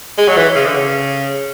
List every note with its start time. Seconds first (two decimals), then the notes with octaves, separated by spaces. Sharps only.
0.18 G#3
0.28 F#3
0.37 E3
0.55 C#3
0.65 D3
0.75 C#3